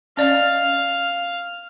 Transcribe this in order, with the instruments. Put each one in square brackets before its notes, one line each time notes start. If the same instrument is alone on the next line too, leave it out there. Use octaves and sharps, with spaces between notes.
[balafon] C#4 D5 D#5 [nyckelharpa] F5